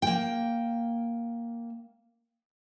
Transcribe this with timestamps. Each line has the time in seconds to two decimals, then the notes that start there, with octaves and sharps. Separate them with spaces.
0.02 A#3 G5